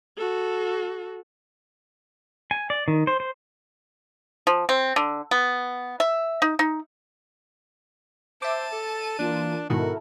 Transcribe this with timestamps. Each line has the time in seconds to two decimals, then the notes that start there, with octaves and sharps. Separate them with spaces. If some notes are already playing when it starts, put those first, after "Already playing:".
0.17 F#4 A4
2.51 G#5
2.70 D5
2.88 D#3
3.07 C5
3.20 C5
4.47 F3
4.69 C4
4.96 D3
5.31 B3
6.00 E5
6.42 D#4
6.59 D#4
8.42 C5 E5 A5 D6 D#7
8.72 A4
9.19 E3 A#3 D4 F4
9.70 G#2 B2 D#3 E4 F#4 A4 A#4